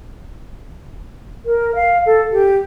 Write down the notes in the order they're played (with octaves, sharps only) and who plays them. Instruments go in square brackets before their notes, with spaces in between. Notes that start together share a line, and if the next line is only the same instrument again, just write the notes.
[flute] A#4
F5
A4
G4